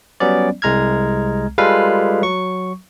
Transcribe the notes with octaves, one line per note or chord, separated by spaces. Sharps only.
F#3 G3 B3 C#4 D5
C2 G#3 A#5 F6 G#6
G3 G#3 F4 A4 B4 F5
F#3 C#6